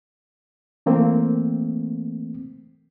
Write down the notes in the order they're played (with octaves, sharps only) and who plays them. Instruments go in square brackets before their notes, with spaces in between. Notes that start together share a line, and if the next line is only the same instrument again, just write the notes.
[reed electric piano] E3 A3 A#3 C4